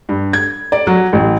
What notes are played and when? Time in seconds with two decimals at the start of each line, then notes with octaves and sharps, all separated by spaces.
0.09 G2
0.33 G#6
0.72 D5
0.87 F#3
1.13 A1